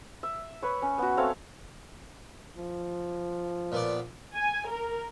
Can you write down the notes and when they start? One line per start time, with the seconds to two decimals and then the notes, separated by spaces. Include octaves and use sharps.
0.23 E5
0.62 B4 C#5
0.82 C#4
0.98 B3 F#4
1.17 A3 C4 C#5 F5
2.57 F3
3.72 A#2 B3 D5
4.37 G#5
4.70 A#4